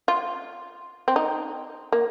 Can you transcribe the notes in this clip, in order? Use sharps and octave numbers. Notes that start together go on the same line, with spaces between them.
F4
C4
D#4
A#3